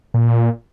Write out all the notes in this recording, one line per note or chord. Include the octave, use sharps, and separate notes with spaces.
A#2